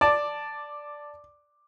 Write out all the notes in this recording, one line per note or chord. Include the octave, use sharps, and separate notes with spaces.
D5 A5 D6